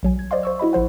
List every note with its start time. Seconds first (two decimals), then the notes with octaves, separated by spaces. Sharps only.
0.03 B1 F#3 G#5
0.19 G#6
0.31 C5 D5 D#5 F5 C6
0.43 C5 C#6 E6
0.59 E4 F#4 D#5 B5
0.73 A1 F3 C5 F#5